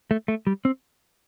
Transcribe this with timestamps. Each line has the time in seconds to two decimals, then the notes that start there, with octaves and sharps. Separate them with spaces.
0.11 A3
0.28 A3
0.47 G3
0.65 C4